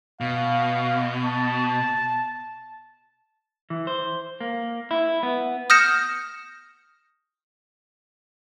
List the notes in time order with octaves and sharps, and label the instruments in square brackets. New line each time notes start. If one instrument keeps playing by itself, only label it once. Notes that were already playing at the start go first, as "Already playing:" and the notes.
[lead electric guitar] B2 [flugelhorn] F5
[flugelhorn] A5
[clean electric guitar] E3
C5
A#3
E4
B3
[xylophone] D#6 F6 G6 A#6 C#7 E7